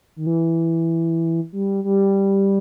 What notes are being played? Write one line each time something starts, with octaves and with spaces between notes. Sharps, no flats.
D#3
E3
G3
G3